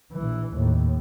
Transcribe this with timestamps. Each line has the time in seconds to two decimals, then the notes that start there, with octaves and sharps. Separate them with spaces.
0.13 A#1 E3
0.54 D#2 A2